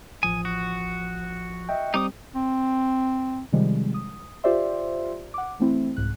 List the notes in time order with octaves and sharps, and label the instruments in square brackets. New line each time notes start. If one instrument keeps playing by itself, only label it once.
[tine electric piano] A1 F3 D#6 [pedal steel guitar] G#5
[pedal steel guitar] F#4
[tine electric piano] D#5 E5 G5
[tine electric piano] G3 C4 [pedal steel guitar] D#4 D6 D#6
[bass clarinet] C4
[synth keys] C3 D#3 F3 G3 G#3
D#6
F4 G4 C5 D5 E5 C6
F#5 D6
E3 A3 C4 E4
C2 G#2 F#6